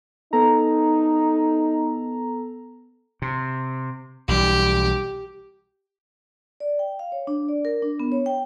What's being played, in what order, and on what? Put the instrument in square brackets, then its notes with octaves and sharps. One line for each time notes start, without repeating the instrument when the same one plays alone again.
[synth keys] B3 A4 A#5 [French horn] D#4
[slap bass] C3
[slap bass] B1 E3 G3 [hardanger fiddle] G4
[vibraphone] D5
G5
F5
C#5
D4
D5
A#4
D4
B3
C#5
G5